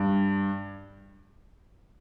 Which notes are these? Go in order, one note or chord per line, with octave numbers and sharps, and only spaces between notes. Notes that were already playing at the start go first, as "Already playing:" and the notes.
Already playing: G2